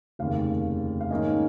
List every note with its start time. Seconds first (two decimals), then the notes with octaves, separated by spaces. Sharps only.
0.19 F1 D#2 C#3 F5
1.00 F5
1.10 G#2 D#3 A#3 C#4 D#5